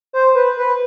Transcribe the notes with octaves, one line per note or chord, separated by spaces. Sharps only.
C5
B4
B4